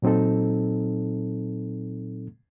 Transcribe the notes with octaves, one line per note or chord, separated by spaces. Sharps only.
A#2 F#3 C4 D#4 A4